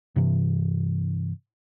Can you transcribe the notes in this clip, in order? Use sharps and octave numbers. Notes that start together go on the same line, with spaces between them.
G2 C3 E3